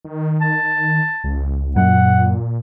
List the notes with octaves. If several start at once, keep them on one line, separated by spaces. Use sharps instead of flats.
D#3
A5
C#2
F#2 A#2 F#5